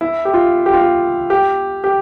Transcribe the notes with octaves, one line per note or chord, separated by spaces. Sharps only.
E4
G4
F4
G4
F4
G4
G4
G4